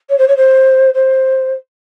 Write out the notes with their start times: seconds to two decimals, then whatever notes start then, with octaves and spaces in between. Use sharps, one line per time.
0.09 C#5
0.18 C5
0.28 C#5
0.36 C5
0.94 C5